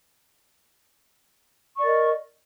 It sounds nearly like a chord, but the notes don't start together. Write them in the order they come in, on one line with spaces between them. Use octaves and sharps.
C#6 D5 A#4 D#5